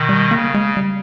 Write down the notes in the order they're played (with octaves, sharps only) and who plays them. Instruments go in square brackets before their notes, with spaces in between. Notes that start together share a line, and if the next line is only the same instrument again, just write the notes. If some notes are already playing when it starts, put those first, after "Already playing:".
Already playing: [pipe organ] B2 D#3
[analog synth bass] G3
[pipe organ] C#3 [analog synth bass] A#3
[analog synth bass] G#3
G3